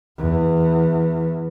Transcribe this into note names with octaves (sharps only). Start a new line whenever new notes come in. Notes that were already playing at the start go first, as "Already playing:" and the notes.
E2